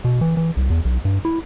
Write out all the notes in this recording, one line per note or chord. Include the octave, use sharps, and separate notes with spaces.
B2
E3
E3
C2
E2
B1
G2
E4